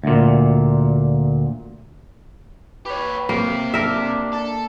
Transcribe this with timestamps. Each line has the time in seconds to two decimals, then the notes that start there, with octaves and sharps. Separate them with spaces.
0.04 D2 A#2
2.86 G4 B4 C#5
3.29 A#3 C4 G4
3.74 D4 A#4 E5
4.33 A4